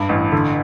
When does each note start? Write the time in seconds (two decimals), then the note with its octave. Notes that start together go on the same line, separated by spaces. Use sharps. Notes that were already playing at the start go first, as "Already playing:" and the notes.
Already playing: G2
0.09 A1
0.32 D3